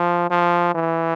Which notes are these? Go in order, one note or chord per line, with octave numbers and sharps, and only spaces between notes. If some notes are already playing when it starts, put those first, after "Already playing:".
Already playing: F3
F3
E3